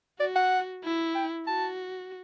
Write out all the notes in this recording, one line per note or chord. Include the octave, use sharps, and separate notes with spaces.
F#4 D5
F#5
E4
G5
F#4 A5